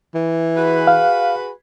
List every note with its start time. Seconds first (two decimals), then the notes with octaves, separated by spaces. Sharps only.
0.15 E3
0.57 F#4 G#4 B4
0.87 F5